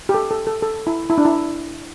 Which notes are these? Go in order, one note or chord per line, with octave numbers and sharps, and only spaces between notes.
G4
A4
A4
A4
A4
E4
E4
D4
E4